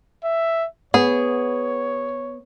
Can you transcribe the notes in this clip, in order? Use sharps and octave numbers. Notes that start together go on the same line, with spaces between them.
E5
B3 G#4 C#5